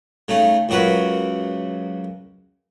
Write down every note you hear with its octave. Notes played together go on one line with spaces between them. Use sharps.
C#3 A3 D#4
C#2 F#2 F#4 A#4 B4